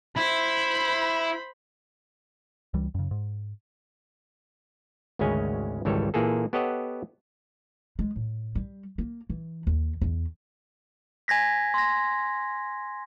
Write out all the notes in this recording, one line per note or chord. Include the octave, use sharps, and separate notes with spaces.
E4 C5 B5
C#2 E3 G3
F#2 C#3
G#2
G#1 D2 C#3 G#3 C#4 G#5
G#1 C#2 E3 G3 A4 C#5
A#2 E3 A#3 G#4 A4
B3 G4 A4 C#5 D#5 F#5
G#3
A2
G3
A#3
E3
D#2
E2
G#5 G#6 A#6 B6
C6 A#6